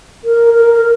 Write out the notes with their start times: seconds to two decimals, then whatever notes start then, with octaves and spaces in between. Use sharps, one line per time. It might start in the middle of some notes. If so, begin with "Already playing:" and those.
0.24 A#4
0.54 A#4
0.74 A#4